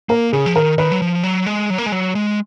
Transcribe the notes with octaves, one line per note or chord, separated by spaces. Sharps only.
A#3 A#4
C#3 G#4
F3
D#3 A#4
D#3 B4
F#3
F3
F#3
G#3
F#3
A#3
G#3
F#3
G#3